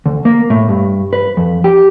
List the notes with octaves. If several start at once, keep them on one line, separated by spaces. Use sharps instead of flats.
D2
A#3
A2
G2
B4
F2
G4